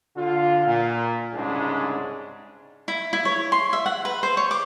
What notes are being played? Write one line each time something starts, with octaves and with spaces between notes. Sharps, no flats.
D3 F4
A#2
C2 G#2 C#3 G#3 D4
E4
E4
C#5
C6
E5
F#5
B4
C5
C#5
D6